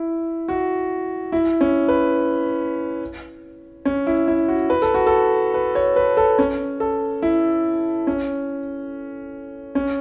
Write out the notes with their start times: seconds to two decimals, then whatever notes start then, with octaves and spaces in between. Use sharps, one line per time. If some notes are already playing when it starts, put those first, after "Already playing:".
Already playing: E4
0.48 F#4
1.32 E4
1.61 C#4
1.88 B4
3.85 C#4
4.07 E4
4.28 E4
4.48 F#4
4.70 B4
4.82 A4
4.94 F#4
5.07 A4
5.54 B4
5.75 C#5
5.96 B4
6.17 A4
6.38 C#4
6.80 A4
7.22 E4
8.07 C#4
9.75 C#4